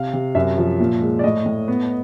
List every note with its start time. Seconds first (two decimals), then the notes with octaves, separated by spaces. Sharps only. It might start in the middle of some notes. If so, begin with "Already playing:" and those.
Already playing: C3 F5
0.13 C3
0.35 F#2 E5
0.58 F3
0.80 A#2
1.01 G#3
1.19 D5
1.24 A2 D#5
1.46 A2
1.68 B3